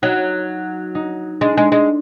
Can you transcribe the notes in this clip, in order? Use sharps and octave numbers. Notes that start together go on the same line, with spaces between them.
F#3 D#4
D#4
G#3 D4
G#3
G#3